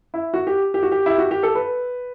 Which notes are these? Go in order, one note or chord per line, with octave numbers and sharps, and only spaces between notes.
E4
F#4
G4
G4
F#4
G4
E4
F#4
G4
A4
B4